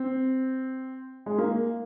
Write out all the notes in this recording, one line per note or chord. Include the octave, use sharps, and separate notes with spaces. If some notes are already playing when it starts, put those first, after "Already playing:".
Already playing: C4
G#3
A#3